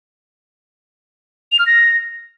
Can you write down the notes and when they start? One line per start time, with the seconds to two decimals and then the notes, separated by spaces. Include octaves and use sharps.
1.52 F7
1.59 F6
1.66 A#6